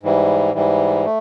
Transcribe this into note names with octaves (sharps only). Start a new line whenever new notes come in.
G#2 E3 G3
G#2 E3 G3
A3